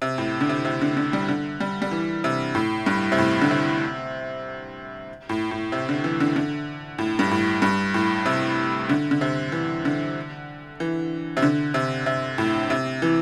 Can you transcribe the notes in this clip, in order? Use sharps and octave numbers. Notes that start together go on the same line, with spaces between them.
C3
A2
D3
C3
C3
D3
D3
G3
D3
G3
G3
E3
C3
A2
G2
C3
A2
D3
C3
A2
A2
C3
D3
E3
D3
D3
A2
G2
A2
G2
A2
C3
D3
D3
C3
E3
D3
E3
C3
D3
C3
C3
A2
C3
E3